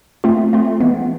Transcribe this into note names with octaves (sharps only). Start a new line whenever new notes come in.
A3 C4 F4
A3 C4 F4
E3 G#3 B3